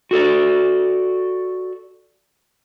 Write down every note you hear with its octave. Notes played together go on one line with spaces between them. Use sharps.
F#4 A4 D5